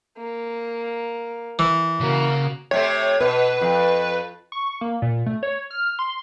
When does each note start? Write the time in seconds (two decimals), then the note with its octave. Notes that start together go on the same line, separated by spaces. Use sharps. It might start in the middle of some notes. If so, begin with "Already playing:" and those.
0.18 A#3
1.59 E3
2.01 C#3 A#3 F#4
2.71 C3 A3 C4 C#5
3.21 B2 B4
3.61 F2
4.52 C#6
4.81 A#3
5.02 A#2
5.26 A3
5.43 C#5
5.71 F6
5.99 C6